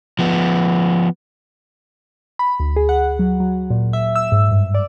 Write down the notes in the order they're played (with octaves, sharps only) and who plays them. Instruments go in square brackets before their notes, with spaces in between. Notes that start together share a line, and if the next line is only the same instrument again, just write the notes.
[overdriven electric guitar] F3 B3
[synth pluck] B5
D2
G#4
F#5
F#3
F#3
A#2
E5
E6
G#2
G2
D5